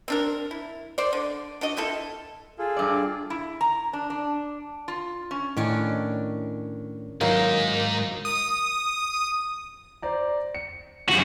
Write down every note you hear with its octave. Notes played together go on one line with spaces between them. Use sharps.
C4 D4 A#4
E4
C5 D5
D3
D4 F#4 D#5
C4 E4 F4 A4
F4 G#4 A4
G2 D5
E4
A#5
D4
D4
F4
C#4
A2 D#3 C#4 D4
G#2 D#3 F#3 A#3 D#4 D#5
D#6
C5 D5 A#5
C#7
F1 F#2 C#3 F#4